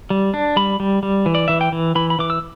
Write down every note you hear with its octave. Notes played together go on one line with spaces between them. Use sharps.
G3
D4
G3 B5
G3
G3
E3
D5
E3 E5
G5
E3
E3 B5
B5
E3 D6
E6